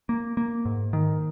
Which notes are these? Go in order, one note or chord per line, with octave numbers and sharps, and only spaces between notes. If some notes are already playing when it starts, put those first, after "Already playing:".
A#3
A#3
G#2
D#3